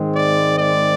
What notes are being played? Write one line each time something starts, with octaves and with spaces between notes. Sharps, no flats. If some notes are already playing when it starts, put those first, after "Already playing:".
Already playing: G#2 D#3 G#3 C4
D5
D5